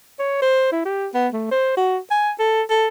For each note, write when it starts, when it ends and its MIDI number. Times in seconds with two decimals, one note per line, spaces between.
0.19 0.40 73
0.42 0.68 72
0.72 0.83 64
0.85 1.08 67
1.14 1.28 59
1.33 1.51 57
1.51 1.75 72
1.77 1.98 66
2.11 2.31 80
2.39 2.62 69
2.70 2.88 69